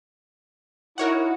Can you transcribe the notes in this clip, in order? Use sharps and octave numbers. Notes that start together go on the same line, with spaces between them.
D#4 E4 F#4 A#4 C#5 F#5